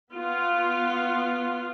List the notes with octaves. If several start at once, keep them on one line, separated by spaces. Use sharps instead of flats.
B3 F4